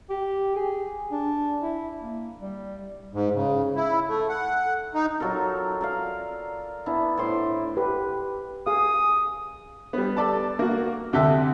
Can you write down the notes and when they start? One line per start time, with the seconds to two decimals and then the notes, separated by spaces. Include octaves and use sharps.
0.09 G4
0.56 G#4
1.11 D4
1.62 E4
2.00 A#3
2.40 G3
3.14 G#2
3.34 C#3
3.76 E4
4.09 A3
4.29 F#5
4.95 D#4
5.20 F#3 F4 A4 A#4
5.81 A#4 D5 F5
6.86 B3 D4 E4
7.17 A2 C5 C6 D6
7.77 G4 B4
8.67 G#4 F5 D#6
9.93 G3 B3
10.17 A4 D5 A5
10.59 A#3 F#4
11.13 D2 C3 G4 A4 E5